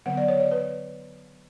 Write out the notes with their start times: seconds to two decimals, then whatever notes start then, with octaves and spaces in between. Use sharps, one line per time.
0.06 D3 F#3 B3 F#5
0.17 D5
0.28 C#5
0.40 D5
0.51 B4